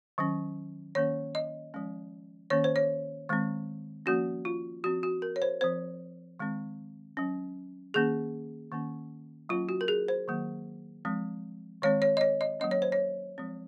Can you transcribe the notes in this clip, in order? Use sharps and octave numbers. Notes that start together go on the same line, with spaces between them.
D#3 F#3 C#4
D#3 A#3 C#4 C#5
D#5
F3 G#3 C#4
D#3 A#3 C#4 C#5
C5
C#5
D#3 G#3 C4
F3 A#3 C#4 F#4
F4
F3 C4 F#4
F#4
A#4
C#5
C5
F3 C4 C5
D#3 G#3 C4
F#3 C#4
D#3 A#3 C#4 G#4
D#3 A#3 C#4
F#3 A#3 C#4 F4
F#4
A#4
G#4
C5
D#3 F#3 A#3
F3 G#3 C4
D#3 G#3 C4 C#5
C#5
D#5
C#5
D#5
F#3 A#3 C#4 D#5
C#5
C5
C#5
F3 G#3 C4